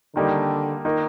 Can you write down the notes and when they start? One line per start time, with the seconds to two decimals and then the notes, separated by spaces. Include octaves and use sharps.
0.15 D3 D#3 G3 A#3 D#4 G4
0.85 D#3 A#3 D#4